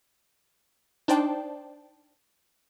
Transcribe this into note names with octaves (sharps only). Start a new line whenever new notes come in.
D4 D#4 C5 D5 G5 A5